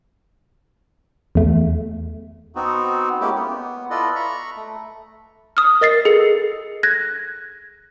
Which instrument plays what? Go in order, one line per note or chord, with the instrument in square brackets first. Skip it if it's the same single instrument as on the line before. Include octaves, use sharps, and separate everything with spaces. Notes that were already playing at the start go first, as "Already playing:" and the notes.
[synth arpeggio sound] E2 A3
[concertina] B3 C4 D#4 F#4
G#3 A#3 C#4 E4 G4
B3
E4 F4 A4 B4 D5 D#5
A#5 B5 C#6
A3
[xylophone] D#6 F6
A#4 D#5 A6 C7
G#4 A4 C#7
F#6 G#6 A#6